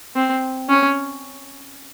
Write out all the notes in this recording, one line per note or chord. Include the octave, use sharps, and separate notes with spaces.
C4
C#4